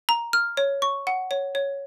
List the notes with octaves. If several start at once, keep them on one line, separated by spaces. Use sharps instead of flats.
A#5
F6
C#5
C#6
F#5
C#5
C#5